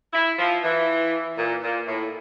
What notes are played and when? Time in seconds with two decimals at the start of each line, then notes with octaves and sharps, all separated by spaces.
0.13 E4
0.39 F3
0.63 E3
1.37 A#2
1.62 A#2
1.88 A2